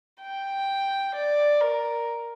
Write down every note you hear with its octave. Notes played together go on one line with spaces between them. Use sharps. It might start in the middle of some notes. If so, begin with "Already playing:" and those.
G5
D5
A#4